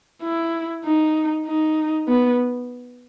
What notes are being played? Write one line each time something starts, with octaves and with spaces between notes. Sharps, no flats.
E4
D#4
D#4
B3